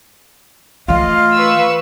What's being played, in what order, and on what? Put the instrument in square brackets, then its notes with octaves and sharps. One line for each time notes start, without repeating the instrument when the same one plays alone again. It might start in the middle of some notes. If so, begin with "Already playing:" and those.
[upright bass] E3 A3 [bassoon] F4 [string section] D#5 [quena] F5
[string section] B4 C#6 E6